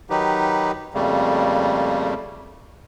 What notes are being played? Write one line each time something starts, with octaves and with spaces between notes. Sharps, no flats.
D#3 F#3 D#4 G4 B4
F2 C#3 G3 A3 A#3